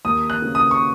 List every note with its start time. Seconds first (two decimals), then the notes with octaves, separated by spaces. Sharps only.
0.05 D#2 D#6
0.30 F#6
0.42 C#3
0.55 D#6
0.71 C#6